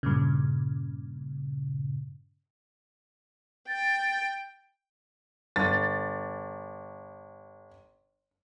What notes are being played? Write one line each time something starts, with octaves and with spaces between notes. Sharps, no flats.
G2 A#2 C#3
G5 A6
G1 A6